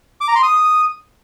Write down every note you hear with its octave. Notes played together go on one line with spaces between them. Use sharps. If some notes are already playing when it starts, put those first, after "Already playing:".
D6
A#5
C6
D#6